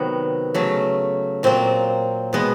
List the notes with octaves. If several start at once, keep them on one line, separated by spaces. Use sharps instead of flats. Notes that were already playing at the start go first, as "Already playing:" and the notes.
Already playing: C3 D#3 F#3 B3
C#3 F#3 A3
A#2 F#3 A#3 C4
B2 G#3 B3